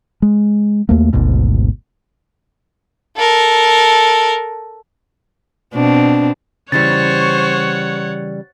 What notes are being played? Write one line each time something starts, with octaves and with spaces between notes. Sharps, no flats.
G#3
D#2 A3 A#3
G#1 D2 G#2 B2
A4 A#4
B2 C4 D4
C#3 E3 G3 C5 C#5 F#5 C#6 A6